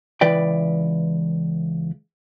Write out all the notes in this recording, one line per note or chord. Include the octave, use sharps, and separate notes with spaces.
C#2 E3 B4 D5 G5